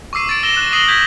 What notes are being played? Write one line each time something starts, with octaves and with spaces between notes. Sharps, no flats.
C#6 D6 E6 C7 D#7
A6 D7
E6 A#6 E7 G7
F#6
D#6 A#6 C7 D#7 F#7 G7
G6 G#6 A#6 B6